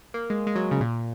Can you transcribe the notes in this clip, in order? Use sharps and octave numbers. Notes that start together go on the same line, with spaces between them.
A#3
G#3
G#3
F#3
C#3
A#2